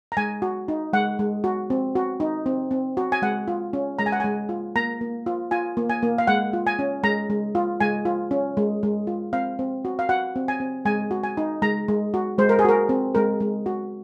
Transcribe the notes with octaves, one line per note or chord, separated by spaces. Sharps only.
A#5
G#3 G#5
F#4
D#4
G#3 F#5
G#3
F#4
C4
F#4
D#4
C4
C4
F#4
G#5
G#3 F#5
F4
C#4
G#3 A#5
G#5
F#5
G#3 G#5
F4
A#3 A#5
A#3
F4
F4 G#5
A#3
G#5
A#3
F5
G#3 F#5
F4
G#5
C#4
G#3 A#5
G#3
F4
G#3 G#5
F4
C#4
G#3
G#3
F4
C4 F5
C4
F#4
F5
F#4 F#5
C4
G#5
C4
G#3 G#5
F#4
G#5
D#4
G#3 A#5
G#3
F#4
G#3 C5
A#4
G#4
F#4 A#4
C4
G#3 A#4
G#3
F#4